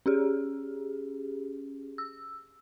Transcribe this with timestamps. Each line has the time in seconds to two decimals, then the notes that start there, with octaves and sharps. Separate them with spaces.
0.06 C#4 G4 G#4
1.98 E6